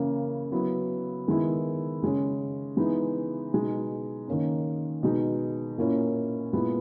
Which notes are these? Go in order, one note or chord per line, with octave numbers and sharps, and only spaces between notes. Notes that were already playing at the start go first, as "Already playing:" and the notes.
Already playing: C#3 E3 A#3 C#4 E4
F#3 B3 E4
D#3 G#3 B3 E4
C#3 G#3 C#4
E3 G#3 B3 D#4
B2 G#3 D#4
D#3 A#3 C#4
B2 G#3 D#4
A#2 A#3 C#4 E4
A#2 G#3 B3 E4